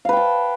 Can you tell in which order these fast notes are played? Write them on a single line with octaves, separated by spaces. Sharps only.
F5 B4 G5 A5